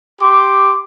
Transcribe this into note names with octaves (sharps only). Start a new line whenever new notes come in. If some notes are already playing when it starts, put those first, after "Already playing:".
G4 C6 D6